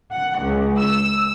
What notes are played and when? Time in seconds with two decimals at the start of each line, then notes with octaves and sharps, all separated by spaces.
0.12 F#5
0.41 C#2
0.80 E6